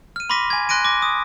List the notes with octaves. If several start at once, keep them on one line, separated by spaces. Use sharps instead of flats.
F6 D#7
B5 C6 D6 A#6 B6 D#7
G#5 G#6
C6 F#6 A#6 D7 D#7
D6 A#6
D#6